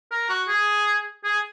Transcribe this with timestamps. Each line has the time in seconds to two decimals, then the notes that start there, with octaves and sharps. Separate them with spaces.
0.11 A#4
0.29 F#4
0.48 G#4
1.24 G#4